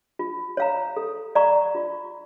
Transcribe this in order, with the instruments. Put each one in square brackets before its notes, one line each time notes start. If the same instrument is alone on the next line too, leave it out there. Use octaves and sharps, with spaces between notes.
[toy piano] F4
C#5 F5 A#5
A4
D5 F5 A#5 C#6
F4